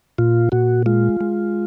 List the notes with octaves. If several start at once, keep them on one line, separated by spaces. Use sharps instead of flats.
A#2 F4
A#2 F#4
G#3 F4
G#3